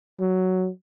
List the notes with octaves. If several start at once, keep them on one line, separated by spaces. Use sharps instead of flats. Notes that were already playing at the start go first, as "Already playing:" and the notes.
F#3